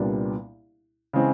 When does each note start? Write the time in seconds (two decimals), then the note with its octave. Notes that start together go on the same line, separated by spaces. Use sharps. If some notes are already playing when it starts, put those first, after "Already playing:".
Already playing: C2 A#2 G3 B3 D4
1.13 C#3 E3 G#3 C4